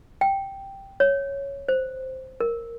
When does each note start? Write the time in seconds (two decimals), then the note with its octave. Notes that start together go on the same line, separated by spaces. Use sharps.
0.21 G5
1.00 C#5
1.69 C5
2.40 A#4